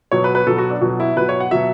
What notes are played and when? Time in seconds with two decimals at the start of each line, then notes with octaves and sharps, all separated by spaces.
0.12 B2 F#3 C#5
0.24 B4
0.35 B4
0.47 B2 F#3 A4
0.58 F#4
0.70 D4
0.81 B2 F#3
1.00 E4
1.16 B2 F#3 B4
1.29 C#5
1.40 F#5
1.51 B2 F#3 E5